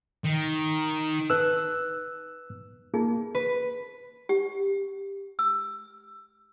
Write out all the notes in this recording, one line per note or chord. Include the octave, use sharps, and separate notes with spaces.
D#3
D#4 B4 E6 F#6
A#3 D#4 F4 G#4
B4
G4
E6